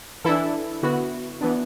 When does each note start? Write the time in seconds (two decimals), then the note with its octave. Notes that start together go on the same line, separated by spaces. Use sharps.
0.24 E3 D4 E4 A4
0.83 D3 B3 E4 F#4
1.41 E3 B3 D4